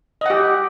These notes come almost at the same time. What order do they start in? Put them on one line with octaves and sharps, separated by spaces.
D#5 F#5 G4